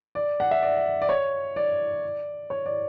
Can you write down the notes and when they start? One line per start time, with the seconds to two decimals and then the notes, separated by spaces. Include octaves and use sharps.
0.15 D5
0.40 F#5
0.51 E5
0.63 D5
1.02 D5
1.09 C#5
1.56 D5
2.50 C#5
2.66 D5